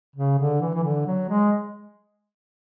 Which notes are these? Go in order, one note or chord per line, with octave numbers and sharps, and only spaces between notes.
C#3
D3
E3
E3
D3
F#3
G#3